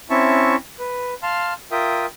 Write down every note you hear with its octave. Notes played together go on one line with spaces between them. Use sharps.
C4 C#4 E4 E5 A5 C#6
B4
F5 A5 C6 F6
F4 A#4 E5 G5 D#6